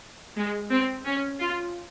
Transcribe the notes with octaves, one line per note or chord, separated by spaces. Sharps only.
G#3
C4
C#4
F4